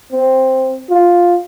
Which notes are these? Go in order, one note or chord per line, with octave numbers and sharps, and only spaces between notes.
C4
F4